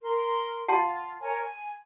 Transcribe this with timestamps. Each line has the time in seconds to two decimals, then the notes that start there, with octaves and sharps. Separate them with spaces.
0.01 A#4 C6
0.68 F4 F#5 A5 C6
1.20 A#4 C#5 G#5
1.37 G#5